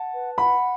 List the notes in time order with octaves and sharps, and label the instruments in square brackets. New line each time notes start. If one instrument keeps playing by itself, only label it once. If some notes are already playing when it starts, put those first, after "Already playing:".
Already playing: [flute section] F#5 [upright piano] A5
[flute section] B4
[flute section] F#5 [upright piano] B5